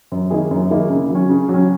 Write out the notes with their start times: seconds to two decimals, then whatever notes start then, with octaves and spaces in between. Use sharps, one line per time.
0.12 F#2
0.30 D#3 A#3 E4 G#4
0.51 F#2
0.70 D#3 A#3 E4 G#4
0.90 C#3
1.09 F#3
1.15 C#4
1.29 C#3
1.49 F#3 C#4